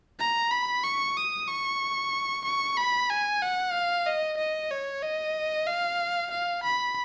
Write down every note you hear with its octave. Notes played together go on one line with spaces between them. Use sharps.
A#5
B5
C#6
D#6
C#6
C#6
B5
G#5
F#5
F5
D#5
D#5
C#5
D#5
F5
F5
B5